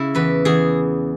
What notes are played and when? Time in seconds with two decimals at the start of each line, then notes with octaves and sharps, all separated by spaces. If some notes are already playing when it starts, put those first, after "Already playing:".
Already playing: C#3 E4
0.15 E2 B4
0.45 E2 G#4